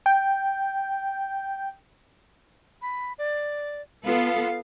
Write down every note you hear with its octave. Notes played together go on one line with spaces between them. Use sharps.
G5 G6
B5
D5
B3 F4 A4 F5